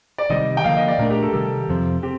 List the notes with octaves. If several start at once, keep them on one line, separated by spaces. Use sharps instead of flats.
D5
C3 D#3 G3 D#5
G5
D3 F3 A#3 F5
D#5
D5
A#2 A3 D4 A#4
G4
A4
C3 D#3 G3 A4
F2 C3 F3 C4
C4 G4